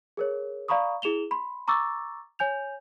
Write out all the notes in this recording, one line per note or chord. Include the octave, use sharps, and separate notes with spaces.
G#4 A#4 C#5
D5 F5 A#5 B5 C#6 D#6
E4 G#4 E7 F7 G7
B5 C6
A#5 C#6 D6 E6 A6
C#5 G#5 G6 F7